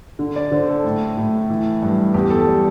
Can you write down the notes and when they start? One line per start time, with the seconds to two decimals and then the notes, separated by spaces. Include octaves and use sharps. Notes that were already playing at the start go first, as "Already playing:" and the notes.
0.19 D3
0.36 D5
0.51 D3 C5
0.69 A4
0.84 A2
1.17 A2
1.50 E3
1.82 G2
2.14 E2 G4
2.30 A4
2.47 G3